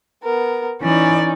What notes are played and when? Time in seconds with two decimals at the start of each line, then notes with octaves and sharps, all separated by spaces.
0.24 B3 A#4
0.82 E3 C#4 D#4 D5